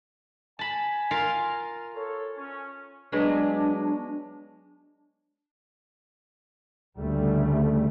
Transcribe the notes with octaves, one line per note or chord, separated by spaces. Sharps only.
G#5 A5 B5
F4 A#4 F5
A4 C#5
C#4
F#3 G#3 B3 D4
D2 C#3 G3 A3